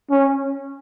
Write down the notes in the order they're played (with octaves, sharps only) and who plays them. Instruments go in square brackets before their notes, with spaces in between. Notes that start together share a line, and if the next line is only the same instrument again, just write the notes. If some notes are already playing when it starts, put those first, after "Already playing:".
[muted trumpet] C#4